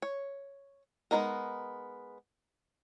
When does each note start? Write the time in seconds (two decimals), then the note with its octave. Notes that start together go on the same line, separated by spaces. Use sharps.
0.02 C#5
1.11 G#3 B3 C#4 D#4 A#4